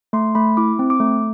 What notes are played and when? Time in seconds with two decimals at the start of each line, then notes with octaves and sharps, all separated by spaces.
0.13 A3 C6
0.35 A3 B5
0.57 E4 D6
0.79 C4
0.90 D6
1.00 A3